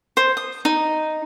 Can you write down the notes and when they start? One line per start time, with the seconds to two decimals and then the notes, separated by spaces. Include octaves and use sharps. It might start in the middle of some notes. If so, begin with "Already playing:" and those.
0.17 C5
0.37 D#6
0.65 D#4